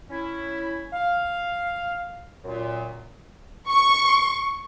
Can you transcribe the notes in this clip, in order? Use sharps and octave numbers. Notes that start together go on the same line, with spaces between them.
C#4 E4
F5
F#2 A#2
C#6